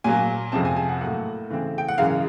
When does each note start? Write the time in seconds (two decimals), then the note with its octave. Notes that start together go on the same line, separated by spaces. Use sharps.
0.04 A#2 F#3 A#3 G#5
0.52 F2 C3 F3 G#3 C4 A5
0.65 G#5
0.76 G#5
0.89 F#5
1.01 A2 F#3 A#3 F#5
1.50 C#3 E3 A3 C4
1.78 G5
1.88 F#5
1.98 F#2 C#3 E3 G#3 F5